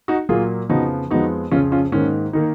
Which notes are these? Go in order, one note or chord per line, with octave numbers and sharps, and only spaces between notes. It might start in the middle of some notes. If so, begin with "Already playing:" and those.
D#4 F#4
A#2 F#3 A#3 F4 G#4
F2 C#3 F3 B3 D#4 F#4
F2 F3 G#3 B3 D#4 F#4
F2 C#3 F3 C#4 F4
C#4 F4
G#2 D#3 A#3 C#4
D#3 A#3 D#4